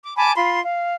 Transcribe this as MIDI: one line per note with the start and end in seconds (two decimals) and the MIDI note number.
0.04 0.16 86
0.17 0.32 80
0.17 0.32 81
0.17 0.32 83
0.17 0.32 86
0.36 0.60 65
0.36 0.60 83
0.36 0.60 84
0.64 0.94 77